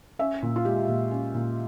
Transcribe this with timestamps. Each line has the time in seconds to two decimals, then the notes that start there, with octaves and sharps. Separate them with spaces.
0.19 C#4 E5
0.42 A#2
0.56 F4
0.65 G#3 G4
0.88 A#2
1.11 C#4
1.34 A#2